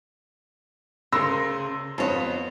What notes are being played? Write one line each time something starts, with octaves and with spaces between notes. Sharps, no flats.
D2 C#3 A#4 C6 E6 A#6
F2 B3 F4 C#5